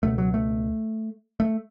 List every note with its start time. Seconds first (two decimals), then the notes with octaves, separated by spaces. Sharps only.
0.03 C#2 B2 A3
0.18 F#3
0.34 A3
1.40 A3